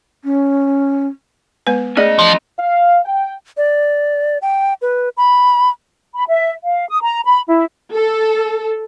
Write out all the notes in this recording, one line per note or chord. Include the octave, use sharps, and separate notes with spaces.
C#4
G#3 B3 B4
A3 C#4 G#4 D5 D#5
F3
F5
G5
D5
G5
B4
B5
B5
E5
F5
D#6
A#5
B5
E4
A4